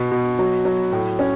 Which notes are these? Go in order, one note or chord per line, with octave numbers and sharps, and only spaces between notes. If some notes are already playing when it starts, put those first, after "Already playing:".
Already playing: B2
B2
F#3
F#3
A2
C#4